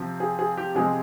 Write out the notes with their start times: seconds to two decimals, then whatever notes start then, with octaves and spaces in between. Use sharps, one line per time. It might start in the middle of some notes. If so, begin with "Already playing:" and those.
Already playing: C3 F3 C4
0.20 G#4
0.39 G#4
0.57 G4
0.75 C3 F3 G#3 C4 G#4